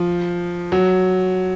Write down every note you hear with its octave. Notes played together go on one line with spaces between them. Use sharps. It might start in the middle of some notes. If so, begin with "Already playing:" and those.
Already playing: F3
F#3